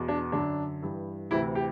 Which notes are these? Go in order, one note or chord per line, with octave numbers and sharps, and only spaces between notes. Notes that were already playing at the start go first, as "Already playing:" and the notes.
Already playing: E2 B2
D4
F#2 D3 D4
G2 E3
D2 C3 E3 E4
G4